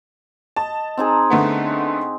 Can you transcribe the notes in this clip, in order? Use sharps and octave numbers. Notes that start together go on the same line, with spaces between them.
D#5 A5
C4 D#4 G#4
D3 A3 B3